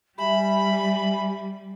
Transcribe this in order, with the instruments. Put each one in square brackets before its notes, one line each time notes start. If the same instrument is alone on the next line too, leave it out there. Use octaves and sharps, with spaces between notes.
[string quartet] G3 [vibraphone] G4 E5 G#5 [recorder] B5